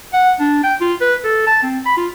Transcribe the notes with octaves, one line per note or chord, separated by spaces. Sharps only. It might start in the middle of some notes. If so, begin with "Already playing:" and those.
F#5
D4
G5
F4
B4
A4
A5
C4
B5
F4